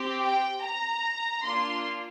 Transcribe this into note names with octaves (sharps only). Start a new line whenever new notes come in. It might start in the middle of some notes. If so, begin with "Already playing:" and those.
Already playing: C4 G4
G5
A#5
A#3 D4 F4 C6